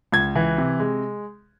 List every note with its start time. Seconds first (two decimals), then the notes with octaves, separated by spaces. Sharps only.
0.12 C#2 G#6
0.36 E3
0.58 C3
0.80 G#3